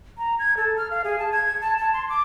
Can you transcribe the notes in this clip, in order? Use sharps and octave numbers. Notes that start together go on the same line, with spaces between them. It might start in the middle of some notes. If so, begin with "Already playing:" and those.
A#5
G#6
A4
F6
F5
G#4
A5
G#6
A5
A5
C6
D6